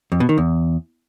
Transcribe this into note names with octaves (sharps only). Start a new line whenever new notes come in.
F2
B2
D#3
E2